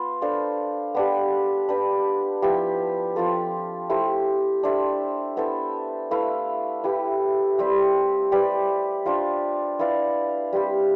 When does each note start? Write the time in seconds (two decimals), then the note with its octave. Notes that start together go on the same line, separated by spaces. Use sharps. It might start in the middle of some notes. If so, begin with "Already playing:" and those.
Already playing: B3 F4
0.22 D4 A4 C5 F5
0.95 B3 D4 G4
1.69 D4 G4 B4
2.42 F3 B3 E4 G4
3.16 F3 C4 F4 A4
3.90 A3 E4 G4 C5
4.63 D4 A4 C5 E5
5.37 B3 E4 A4 C5
6.11 A3 E4 B4 F5
6.84 E4 G4 B4
7.58 G3 C4 G4
8.32 C4 G4 B4 D5
9.05 D4 F4 C5
9.79 E4 B4 D5 F5
10.53 G3 C4 G4